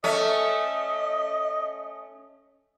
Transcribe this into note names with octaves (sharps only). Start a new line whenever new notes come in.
A3 C#4 D#5